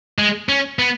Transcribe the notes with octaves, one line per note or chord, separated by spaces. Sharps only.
G#3
C#4
B3